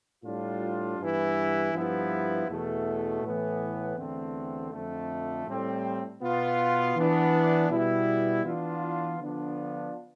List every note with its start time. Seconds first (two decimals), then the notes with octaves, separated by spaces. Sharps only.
0.24 A2 G3 D4 F4
0.99 G2 E3 B3 E4
1.73 G2 F3 B3 E4
2.48 E2 B2 A3
3.22 A2 E3 B3
3.96 E2 D3 A3 C4
4.72 F2 D3 A3
5.46 A2 G3 C4
6.21 B2 B3 F4
6.96 E3 B3 D4
7.69 B2 G3 B3 E4
8.44 E3 B3 D4 F4
9.20 D3 F3 B3 D4 F4